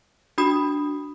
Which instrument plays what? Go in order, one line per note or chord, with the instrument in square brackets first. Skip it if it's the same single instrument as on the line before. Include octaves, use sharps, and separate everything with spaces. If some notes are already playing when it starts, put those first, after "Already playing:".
[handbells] D4 F#4 B5 D#6